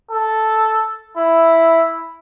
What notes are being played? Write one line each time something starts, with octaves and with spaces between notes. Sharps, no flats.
A4
E4